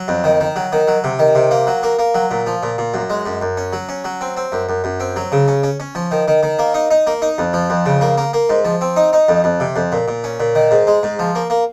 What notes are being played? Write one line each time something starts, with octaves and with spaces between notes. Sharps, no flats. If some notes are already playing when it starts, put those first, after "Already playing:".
Already playing: F#3
F2
D#3
D#3
F#3
D#3
F#3
C3
D#3
C3
A#3
F#3
A#3
A#3
F#3
A#2
F3
A#2
A#2
F#2
G#3
F#2
F#2
C#4
F#3
C#4
F#3
C4
C4
F#2
F#2
F#2
C4
F#3
C#3
C#4
C#4
C#4
F3
D#3
D#3
D#3
A#3
D#4
D#4
A#3
D#4
F2
F3
F2
C#3
A#3
A#3
A#3
G#2
F3
C4
D#4
D#4
F2
F2
C3
F2
A#2
A#2
C#4
A#2
D#3
G#2
G#3
G#2
F3
A#3
A#3